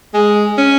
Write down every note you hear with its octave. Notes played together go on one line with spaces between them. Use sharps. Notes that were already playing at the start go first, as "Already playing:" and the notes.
G#3
C#4